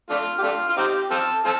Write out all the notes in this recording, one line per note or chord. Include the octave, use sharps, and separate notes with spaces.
A3 D4 F4
G4
A3 D4 F4
F4
C4 D#4 G4
C4 F4 A4
C4 F4 A4